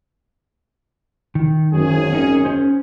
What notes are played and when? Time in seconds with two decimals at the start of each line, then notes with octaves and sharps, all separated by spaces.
1.35 D#3
1.73 G#1 F#2 G#4
2.13 C#4 D#4
2.45 C#4 C5